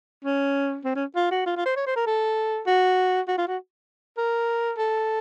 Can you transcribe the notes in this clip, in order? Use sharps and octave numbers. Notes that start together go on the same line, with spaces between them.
C#4
C4
C#4
F4
F#4
F4
F4
C5
C#5
C5
A#4
A4
F#4
F#4
F4
F#4
A#4
A4